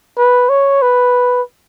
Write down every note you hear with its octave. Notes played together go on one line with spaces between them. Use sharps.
B4
C#5
B4